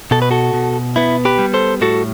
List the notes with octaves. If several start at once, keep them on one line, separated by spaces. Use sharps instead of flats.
B2 A4
B4
F#4 A4
B2
B3 E4
G4 B4
G3
A4 C5
A2 F#4 A4